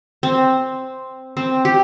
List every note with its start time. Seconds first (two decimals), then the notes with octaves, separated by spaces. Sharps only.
0.23 C4
1.37 C4
1.65 G4